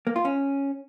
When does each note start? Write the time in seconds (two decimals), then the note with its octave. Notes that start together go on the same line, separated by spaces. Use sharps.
0.07 A#3
0.16 F4
0.25 C#4